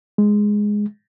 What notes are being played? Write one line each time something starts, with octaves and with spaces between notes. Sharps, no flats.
G#3